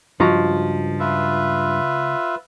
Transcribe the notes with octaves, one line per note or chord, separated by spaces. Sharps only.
C#2 G2 F3 F#4 A#5
F4 B4 E5